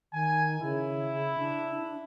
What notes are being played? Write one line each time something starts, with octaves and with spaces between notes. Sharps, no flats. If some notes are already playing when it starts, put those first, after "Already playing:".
D#3 G#5
C#3 E4
D4
D4